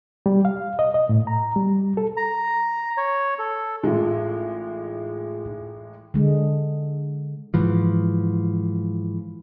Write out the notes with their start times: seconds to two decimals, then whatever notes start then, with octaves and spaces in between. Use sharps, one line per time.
0.26 G3
0.45 F5
0.79 D#5
0.94 D#5
1.09 A2
1.27 A#5
1.56 G3
1.97 A4
2.17 A#5
2.97 C#5
3.39 A4
3.83 A1 G#3 D#4 F4
6.14 D3 G#3
7.54 G#2 E3 F3